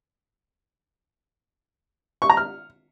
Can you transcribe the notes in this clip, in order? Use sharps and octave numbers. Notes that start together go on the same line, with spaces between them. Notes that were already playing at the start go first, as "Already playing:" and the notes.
C#6
A#5
F6